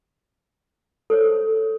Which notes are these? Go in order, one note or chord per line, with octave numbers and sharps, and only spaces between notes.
A4 C5 C#5